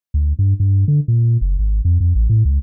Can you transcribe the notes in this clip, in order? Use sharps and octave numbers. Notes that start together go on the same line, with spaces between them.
D2
G2
G2
D3
A#2
F#1
G#1
F2
F2
A1
A2
C#2